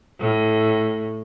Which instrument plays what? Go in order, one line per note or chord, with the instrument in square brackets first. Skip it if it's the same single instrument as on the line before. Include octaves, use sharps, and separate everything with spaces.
[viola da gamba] A2